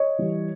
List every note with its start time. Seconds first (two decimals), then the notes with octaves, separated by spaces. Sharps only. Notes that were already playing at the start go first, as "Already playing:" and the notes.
Already playing: C#5 D#5
0.18 E3 G3